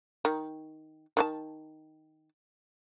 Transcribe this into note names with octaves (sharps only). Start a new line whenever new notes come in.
D#3
D#3 F#4 A5